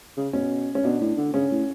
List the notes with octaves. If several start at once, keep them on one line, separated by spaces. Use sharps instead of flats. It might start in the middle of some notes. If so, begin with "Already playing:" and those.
C#3
B2 C#4
C#4
B2 D4
A2
D3
C#3 C#4
A2